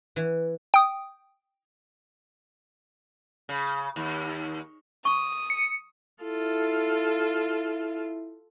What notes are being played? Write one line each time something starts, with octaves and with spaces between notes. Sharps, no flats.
E3
G5 D#6
C#3
D#2
C#6 D#6
C#7
E4 F4 A4